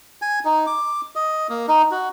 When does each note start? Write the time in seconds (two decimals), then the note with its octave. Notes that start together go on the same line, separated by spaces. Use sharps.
0.22 G#5
0.45 D#4
0.67 D6
1.15 D#5
1.50 A#3
1.68 D#4
1.91 F#4